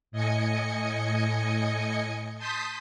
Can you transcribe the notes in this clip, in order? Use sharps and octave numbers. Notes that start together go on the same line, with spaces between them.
A2 D#5 G#5 C#7
A5 C6 D#6 G6 B6